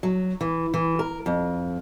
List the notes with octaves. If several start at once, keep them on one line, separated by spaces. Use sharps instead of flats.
F#3
E3
E3
A#4
F2